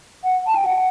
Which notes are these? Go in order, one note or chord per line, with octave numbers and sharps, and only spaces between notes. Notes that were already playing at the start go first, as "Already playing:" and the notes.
F#5
A5
G5
F#5